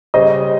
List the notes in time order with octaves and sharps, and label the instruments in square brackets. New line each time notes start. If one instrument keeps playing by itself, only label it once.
[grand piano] C#3 G3 C#4 G4 [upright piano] C5 D#5